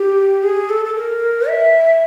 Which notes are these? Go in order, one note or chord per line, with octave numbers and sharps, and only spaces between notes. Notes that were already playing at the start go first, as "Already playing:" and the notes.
Already playing: G4
G#4
A4
A4
A#4
E5